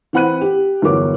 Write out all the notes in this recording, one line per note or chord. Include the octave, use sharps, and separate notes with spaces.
E3 C4 F#5 B5 F#6 D#7
G4
G1 E2 F#3 A#4 C#5 D6